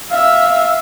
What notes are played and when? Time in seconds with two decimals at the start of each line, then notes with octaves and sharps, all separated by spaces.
0.11 E5 F5